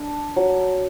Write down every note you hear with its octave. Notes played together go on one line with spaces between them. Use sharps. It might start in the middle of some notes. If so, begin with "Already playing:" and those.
Already playing: D4
F#3